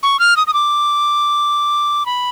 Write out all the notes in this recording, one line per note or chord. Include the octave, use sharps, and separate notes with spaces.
C#6
F6
D#6
D#6
D6
B5